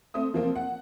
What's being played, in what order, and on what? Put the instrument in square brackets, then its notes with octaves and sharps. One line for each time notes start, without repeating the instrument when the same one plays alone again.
[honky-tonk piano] A3 C4 D#6
C3 F3 A#3 C4
F#5